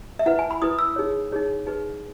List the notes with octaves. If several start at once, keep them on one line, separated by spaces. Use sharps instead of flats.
E5
E4 B4 F#5
G#5
B5
E4 B4 D#6
E6
D#4 G#4 C#5
D#4 G#4 C#5
D#4 G#4 B4